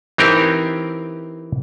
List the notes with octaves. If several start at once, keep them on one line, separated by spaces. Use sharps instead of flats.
E3 C4 D#4 G4 A#4